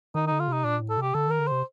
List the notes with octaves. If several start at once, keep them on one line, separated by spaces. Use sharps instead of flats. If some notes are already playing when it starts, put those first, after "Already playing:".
D#3 D#4
D#4
D3
F4
C3 D#4
A#2 D4
A2
A4
C3 G4
D3 A4
D#3 A#4
D3
C3 C5